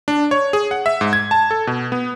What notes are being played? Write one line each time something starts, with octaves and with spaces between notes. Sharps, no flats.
D4
C#5
G#4
F#5
E5
G#2
G#6
A5
A4
B2
B3